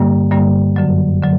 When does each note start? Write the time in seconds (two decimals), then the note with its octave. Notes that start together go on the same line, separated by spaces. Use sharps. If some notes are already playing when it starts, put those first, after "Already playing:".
Already playing: G2 D3 G3 A#3
0.31 G2 D3 G3 A#3
0.76 F#2 D3 F#3
1.23 D3 F#3